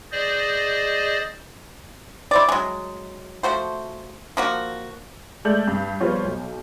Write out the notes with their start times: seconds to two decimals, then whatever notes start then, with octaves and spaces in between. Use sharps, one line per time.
0.12 G#4 C5 D5 D#5
2.31 E4 C5 D5
2.49 F#3 G#3
3.43 F3 A3 F#4 C5
4.37 F3 A#3 F#4
5.45 G#3 A3 A4 D5 G6 F#7
5.68 G2
6.01 F3 G3 B3 F4 C5 C#5
6.24 B1